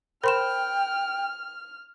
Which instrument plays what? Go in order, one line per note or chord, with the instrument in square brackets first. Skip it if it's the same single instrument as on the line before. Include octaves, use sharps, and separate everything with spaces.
[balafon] A#4 C5 [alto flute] G5 [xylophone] B5 C6 E7 [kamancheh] F6